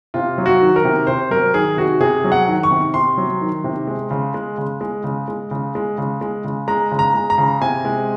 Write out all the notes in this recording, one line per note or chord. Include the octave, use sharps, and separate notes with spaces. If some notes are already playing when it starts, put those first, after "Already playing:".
C3 F4
F#3
F#4
D#3
A#4
C3
C3 C5
F#3 A#4
D#3 G#4
C3 F#4
C3 G#4
F#3
F#5
D#3
C#6
C3
C3 C6
F#3
D#3
C3
G#3
C#3
G#3
C#3
G#3
C#3
G#3
C#3
G#3
C#3
G#3
C#3
G#3 A#5
C#3
A#5
G#3
A#5
C#3
C3 G#5
G#3